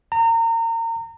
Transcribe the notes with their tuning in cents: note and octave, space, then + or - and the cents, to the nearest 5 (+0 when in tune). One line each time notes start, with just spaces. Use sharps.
A#5 -30